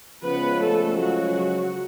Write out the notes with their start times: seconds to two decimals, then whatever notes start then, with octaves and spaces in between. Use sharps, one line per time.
0.23 C#3 F3 G#3 B3 C#4 B4
0.61 A3 A4
0.98 F#3 F#4